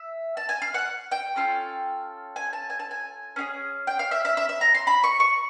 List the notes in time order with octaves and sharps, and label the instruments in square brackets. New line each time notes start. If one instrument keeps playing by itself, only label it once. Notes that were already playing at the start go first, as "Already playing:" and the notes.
Already playing: [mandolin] E5
A5
G#5
F5
F#5
G5
C#4 F4 A4
G#5
A5
G#5
A5
G#5
C#4 F4 G#4
G5
F5
E5
E5
E5
E5
A#5
C6
B5
C#6
C#6